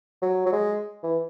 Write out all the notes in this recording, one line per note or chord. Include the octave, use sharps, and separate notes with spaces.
F#3
F#3
G#3
E3